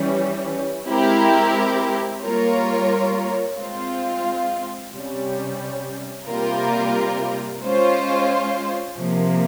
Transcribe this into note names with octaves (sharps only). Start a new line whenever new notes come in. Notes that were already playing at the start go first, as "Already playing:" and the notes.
Already playing: E3 G3 C#4
G#3 C4 E4 G4 A#4
G3 A#3 F4 A#4 C#5
G#3 C4 F4
C3 G3 C#4
C3 G3 A#3 F4 A#4
G#3 C#4 F4 C5
C3 F3 A#3